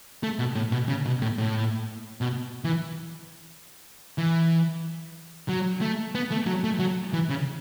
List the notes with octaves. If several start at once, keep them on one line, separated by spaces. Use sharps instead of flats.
A3
B2
A2
B2
C#3
B2
A2
A2
B2
E3
E3
F#3
A3
B3
A3
F#3
A3
F#3
E3
C#3